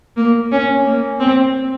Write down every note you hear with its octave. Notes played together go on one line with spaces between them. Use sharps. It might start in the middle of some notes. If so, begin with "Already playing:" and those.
A#3
C#4
A#3
C4